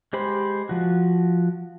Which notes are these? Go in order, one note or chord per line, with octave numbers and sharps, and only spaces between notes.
G#3 G4 C5 B5
F3 F#4